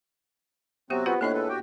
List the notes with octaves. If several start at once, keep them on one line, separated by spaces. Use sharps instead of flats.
C3 F#3 B3 C4 F#4 G4
B3 F4 G4 C5
A2 A#3 C#4 D4 D#5 F#6
G#3 A4 B4
F#4 G4 G5